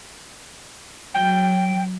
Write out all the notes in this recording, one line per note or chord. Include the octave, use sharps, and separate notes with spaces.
F#3 G5